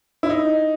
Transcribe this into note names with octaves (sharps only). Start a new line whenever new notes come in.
E4
D#4